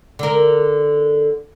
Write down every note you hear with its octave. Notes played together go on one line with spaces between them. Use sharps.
D3 A#4